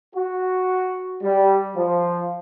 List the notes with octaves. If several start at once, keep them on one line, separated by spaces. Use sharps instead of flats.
F#4
G3
F3